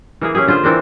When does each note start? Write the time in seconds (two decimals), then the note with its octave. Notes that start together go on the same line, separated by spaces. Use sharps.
0.21 E3 A#3 G#4
0.35 C#4 E4 G4 G#4
0.47 D3 F4 G#4 C5
0.63 E3 C4 D4 A#4